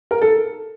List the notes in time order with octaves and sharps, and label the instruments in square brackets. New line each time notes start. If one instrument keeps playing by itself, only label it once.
[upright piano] A#4
A4